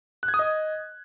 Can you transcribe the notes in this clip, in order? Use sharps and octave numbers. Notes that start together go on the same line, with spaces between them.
F#6
G#6
D#6
D#5